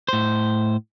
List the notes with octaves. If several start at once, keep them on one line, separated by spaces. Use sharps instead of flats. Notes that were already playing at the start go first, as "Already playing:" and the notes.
A2 C5